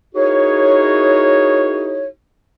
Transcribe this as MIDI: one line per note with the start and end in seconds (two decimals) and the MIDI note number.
0.15 2.07 63
0.15 2.07 64
0.15 2.07 66
0.15 2.07 68
0.15 2.07 70
0.15 2.07 73